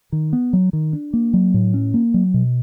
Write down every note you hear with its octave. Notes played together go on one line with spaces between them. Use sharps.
D#3
B3
F#3
D#3
D4
A#3
F#3
A2
C#4
A#3
F#3
B2